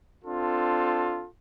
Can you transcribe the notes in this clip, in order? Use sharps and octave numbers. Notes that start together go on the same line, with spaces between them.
C4 D4 F4 A4